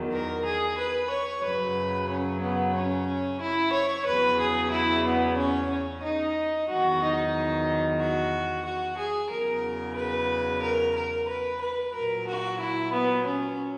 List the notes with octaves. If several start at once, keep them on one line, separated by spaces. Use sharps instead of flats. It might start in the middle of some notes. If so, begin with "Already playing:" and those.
Already playing: E2 D#3 F#3
A#4
G#4
B4
C#5
F#2 C#3 F#3 B4
C#4
B3
C#4
E4
C#5
E2 C#3 F#3 B4
G#4
E4
B3
C#4
C#4
D#4
E2 D#3 F#3 F#4
D#4
F#4
F#4
G#4
E2 C#3 F#3 A#4
B4
A#4
A#4
B4
B4
A#2 F#3 A#4
F#4
E4
B3
C#4